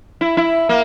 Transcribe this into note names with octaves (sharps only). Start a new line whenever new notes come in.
E4
E4
A#3